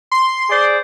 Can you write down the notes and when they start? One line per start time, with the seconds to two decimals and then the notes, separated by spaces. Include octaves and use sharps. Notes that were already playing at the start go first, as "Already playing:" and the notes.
0.12 C6
0.50 G#4 C5 D5